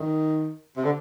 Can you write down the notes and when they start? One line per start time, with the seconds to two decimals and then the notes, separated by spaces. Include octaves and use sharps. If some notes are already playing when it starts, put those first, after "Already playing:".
Already playing: D#3
0.77 C3
0.85 D3